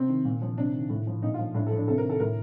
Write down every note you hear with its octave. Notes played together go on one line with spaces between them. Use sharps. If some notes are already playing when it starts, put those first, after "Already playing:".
Already playing: C3 C4
D#3
A#2
F3
C3 D4
D#3
A2
F3
A#2 D#4
F4
F3
A2 D4
A4
F3
D4
C3 A4
A#4
D#3
A4
A2 A#4